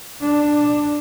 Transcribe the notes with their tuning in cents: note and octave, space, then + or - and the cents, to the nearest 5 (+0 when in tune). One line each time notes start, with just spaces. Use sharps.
D4 +5